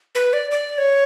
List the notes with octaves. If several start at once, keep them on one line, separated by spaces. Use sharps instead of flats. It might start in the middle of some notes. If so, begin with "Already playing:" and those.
B4
D5
D5
C#5